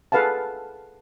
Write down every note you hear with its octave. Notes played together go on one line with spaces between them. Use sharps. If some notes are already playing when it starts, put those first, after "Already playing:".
G#4 A4 B4 F5 F#5 A5